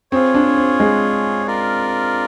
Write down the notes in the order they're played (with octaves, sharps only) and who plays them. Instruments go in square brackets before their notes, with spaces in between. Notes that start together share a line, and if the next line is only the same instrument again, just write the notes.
[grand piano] C4 [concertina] F4 G#4 C#5
[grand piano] D4
C4
G#3
[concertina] F4 A#4 D5